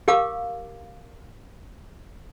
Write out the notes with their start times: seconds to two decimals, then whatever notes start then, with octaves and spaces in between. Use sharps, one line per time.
0.08 G4 A#4 F5 D6